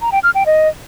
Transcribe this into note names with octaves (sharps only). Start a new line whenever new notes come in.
A#5
G5
F6
G5
D#5